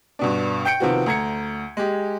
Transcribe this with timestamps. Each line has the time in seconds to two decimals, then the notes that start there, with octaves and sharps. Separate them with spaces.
0.19 G2 B2 D4
0.65 G5 G6 C#7 D7
0.80 C3 D#3 F3 B3 F#4
1.06 D2 A#5 G#6 C#7
1.77 G#3 G4